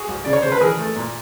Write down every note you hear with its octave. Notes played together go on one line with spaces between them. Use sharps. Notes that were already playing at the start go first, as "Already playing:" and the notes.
Already playing: F#4 G#4
C2
C#3 D5
C#5
C#3 C5
B4
E3 G#4 A#4
A3
A#2